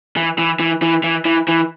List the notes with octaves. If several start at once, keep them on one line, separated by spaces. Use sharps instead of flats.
E3
E3
E3
E3
E3
E3
E3